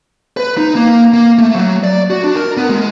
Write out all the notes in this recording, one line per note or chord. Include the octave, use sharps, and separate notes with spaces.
B4
D#4
A#3
A#3
A3
F#3
D5
F#4
D4
A#4
B3
G#3